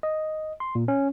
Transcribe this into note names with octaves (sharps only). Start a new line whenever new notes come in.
D#5
C6
A#2
C#4